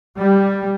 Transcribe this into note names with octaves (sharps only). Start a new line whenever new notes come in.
G3